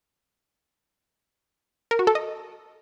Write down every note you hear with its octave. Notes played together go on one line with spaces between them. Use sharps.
A#4
F#4
A4
D#5